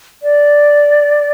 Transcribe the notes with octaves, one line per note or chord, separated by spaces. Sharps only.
D5